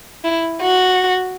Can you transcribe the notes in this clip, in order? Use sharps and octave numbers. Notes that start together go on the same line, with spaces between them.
E4
F#4